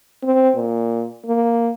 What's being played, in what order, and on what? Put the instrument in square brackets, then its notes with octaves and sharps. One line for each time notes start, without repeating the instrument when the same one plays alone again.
[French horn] C4
A#2
A#3